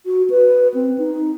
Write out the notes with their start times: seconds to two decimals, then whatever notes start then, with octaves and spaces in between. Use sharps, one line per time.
0.06 F#4
0.30 B4
0.74 C4
0.98 D#4